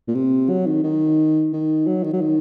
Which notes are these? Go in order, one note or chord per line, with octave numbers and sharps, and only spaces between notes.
A#2
C3
F#3
D#3
D#3
D#3
F#3
D#3
F#3
D#3